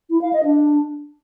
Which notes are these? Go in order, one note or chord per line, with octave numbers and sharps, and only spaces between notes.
E4
F5
D#5
D4